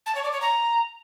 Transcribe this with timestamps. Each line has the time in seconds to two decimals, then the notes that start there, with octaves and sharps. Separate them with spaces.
0.06 A5
0.15 C#5
0.23 D5
0.32 C#5
0.41 A#5